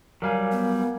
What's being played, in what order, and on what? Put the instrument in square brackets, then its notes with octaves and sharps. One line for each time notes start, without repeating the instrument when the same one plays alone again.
[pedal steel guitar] F#3 G3 [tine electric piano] A#4 F5 G#5
[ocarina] B3